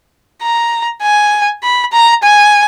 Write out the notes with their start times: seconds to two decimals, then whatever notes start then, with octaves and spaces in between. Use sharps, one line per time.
0.43 A#5
1.02 G#5
1.63 B5
1.93 A#5
2.23 G#5